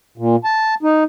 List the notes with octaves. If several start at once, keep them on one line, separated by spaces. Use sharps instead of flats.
A#2
A5
D#4